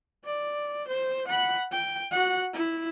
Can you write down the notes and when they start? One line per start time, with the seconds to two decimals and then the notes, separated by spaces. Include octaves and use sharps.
0.25 D5
0.87 C5
1.28 F#5 B5
1.71 G5
2.11 F#4 F#5
2.54 E4